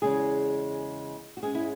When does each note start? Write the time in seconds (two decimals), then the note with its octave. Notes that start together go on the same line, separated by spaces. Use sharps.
0.02 E2 C#3 G#3 G#4
1.37 F#4
1.42 G#2 G#3 C#4 G#4
1.55 E4